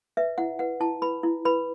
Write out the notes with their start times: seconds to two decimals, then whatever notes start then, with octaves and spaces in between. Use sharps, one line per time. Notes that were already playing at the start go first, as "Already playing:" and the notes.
0.17 B4 E5
0.38 E4 F#5
0.59 B4 F#5
0.81 E4 A5
1.02 B4 B5
1.23 E4
1.45 B4 B5